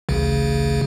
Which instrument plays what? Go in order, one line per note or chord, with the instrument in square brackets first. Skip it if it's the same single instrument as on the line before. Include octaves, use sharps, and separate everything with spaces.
[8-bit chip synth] A1 D2 C#3